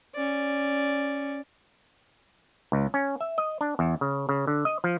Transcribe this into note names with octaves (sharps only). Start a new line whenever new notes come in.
C#4 D5
C#2
C#4
E5
D#5
D4
E2
C#3
C#3
D3
D#5
F3